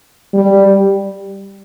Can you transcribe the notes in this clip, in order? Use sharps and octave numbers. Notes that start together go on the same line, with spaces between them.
G3